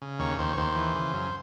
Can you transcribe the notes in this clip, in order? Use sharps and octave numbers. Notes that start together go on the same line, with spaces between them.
C#3
D#2 C#5
D#2 C5
C#5
D#2 C5
E3
C#3
F#2